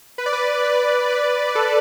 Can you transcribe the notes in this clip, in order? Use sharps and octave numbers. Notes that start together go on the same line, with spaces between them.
B4
D5
B4
B4
B4
A4